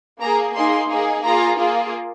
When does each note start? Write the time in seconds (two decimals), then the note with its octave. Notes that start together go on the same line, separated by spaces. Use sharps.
0.21 A#3 G#4 A#5
0.55 A#3 D#4 G#4 C6
0.90 A#3 D#4 G#4
1.23 A#3 F4 G#4 A#5
1.58 A#3 F4 G#4